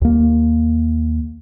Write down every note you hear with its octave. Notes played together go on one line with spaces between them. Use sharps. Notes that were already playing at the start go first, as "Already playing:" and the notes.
D#2 A#3